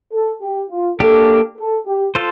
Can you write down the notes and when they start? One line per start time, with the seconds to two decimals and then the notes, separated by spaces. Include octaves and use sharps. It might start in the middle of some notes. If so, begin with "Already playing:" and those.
0.12 A4
0.41 G4
0.70 F4
0.99 A#3 D4 G4 A4
1.58 A4
1.87 G4
2.15 F4 A4 C5